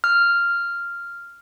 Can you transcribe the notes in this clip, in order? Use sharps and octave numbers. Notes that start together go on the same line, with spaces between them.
F6